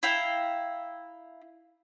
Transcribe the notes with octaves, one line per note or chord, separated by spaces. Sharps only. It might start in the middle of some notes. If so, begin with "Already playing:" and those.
E4 F5 G5 A#5